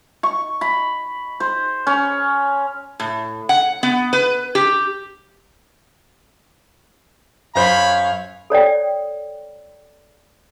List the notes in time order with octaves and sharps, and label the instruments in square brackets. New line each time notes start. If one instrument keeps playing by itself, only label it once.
[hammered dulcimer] C#6
B5
C5
C#4
[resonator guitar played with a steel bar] A2
F#5
B3
B4
G4
[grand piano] F#2 C5 [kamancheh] C#5 F5 [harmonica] B5
[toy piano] A4 C#5 D5 G5